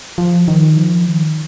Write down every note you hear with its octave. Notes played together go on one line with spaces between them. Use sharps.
F3
D#3
F3
D#3